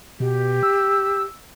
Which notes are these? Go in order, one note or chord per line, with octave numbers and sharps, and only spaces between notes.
B2 G4
E6